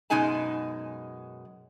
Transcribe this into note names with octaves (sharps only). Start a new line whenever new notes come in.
F#2 B2 G#3 D#4 G#5 A5